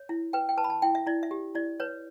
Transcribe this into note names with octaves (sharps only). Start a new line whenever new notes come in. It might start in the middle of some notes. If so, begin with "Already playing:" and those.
Already playing: C#5
E4
B4 G5
G5
B4 A5
B5
A5
E4 G5
E5
E4 D5
E5
G4
E4 D5
B4 C#5